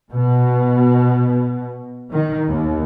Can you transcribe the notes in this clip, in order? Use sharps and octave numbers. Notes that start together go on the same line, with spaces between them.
B2
D#3
D#2